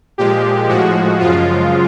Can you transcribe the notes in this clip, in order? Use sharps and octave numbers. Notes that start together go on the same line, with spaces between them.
A#2 F3 G#3 G4
A2 F3 G#3 F#4
F#2 C#3 F3 G#3 F4